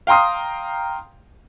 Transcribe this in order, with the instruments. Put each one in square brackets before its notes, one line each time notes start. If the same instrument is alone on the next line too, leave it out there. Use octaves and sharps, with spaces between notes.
[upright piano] F5 G5 A#5 C6 D#6